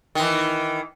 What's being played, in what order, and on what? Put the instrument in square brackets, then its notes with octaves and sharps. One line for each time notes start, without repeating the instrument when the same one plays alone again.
[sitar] D#3 E3